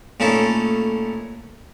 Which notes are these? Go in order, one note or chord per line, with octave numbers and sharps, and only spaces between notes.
A#2 A3 C#4 D#4 E4 A4